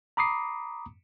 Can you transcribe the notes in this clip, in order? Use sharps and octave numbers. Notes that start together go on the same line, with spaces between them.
A#5 B5 D6 D#6 C7